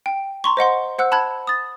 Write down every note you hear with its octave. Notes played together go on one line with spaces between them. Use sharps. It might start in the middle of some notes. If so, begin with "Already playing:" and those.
G5
A#5 C6 C#6
C5 D#5 F#5 C6
C5 F#5 E6 F#6
A5 B5 F#6 G#6
D#6 A6